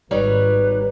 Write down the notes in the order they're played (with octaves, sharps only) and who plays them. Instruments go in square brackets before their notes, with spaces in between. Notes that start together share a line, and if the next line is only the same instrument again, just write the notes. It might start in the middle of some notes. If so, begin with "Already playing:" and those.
[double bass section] G#1 [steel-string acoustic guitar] G3 D#4 C#5 [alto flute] B4